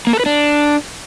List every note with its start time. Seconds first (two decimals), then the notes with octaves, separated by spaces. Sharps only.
0.07 A#3
0.13 A4
0.20 B4
0.26 D4